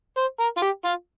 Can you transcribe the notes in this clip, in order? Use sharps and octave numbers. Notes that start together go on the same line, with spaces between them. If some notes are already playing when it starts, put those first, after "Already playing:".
C5
A#4
F4
G4
F4